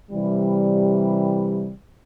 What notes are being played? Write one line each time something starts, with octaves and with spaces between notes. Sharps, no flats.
C3 E3 G3